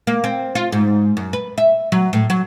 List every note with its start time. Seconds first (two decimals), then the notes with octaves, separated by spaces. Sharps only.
0.07 A#3
0.24 C4
0.55 F4
0.72 G#2
1.17 F#2
1.33 B4
1.58 E5
1.92 F#3
2.13 A2
2.30 F#3